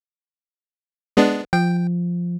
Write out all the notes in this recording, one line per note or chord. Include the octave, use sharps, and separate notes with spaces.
G#3 B3 D4
F3 G5